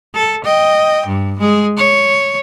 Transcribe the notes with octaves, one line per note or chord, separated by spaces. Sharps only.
A4
D#5 G5
G2
G#3 G#4
C#5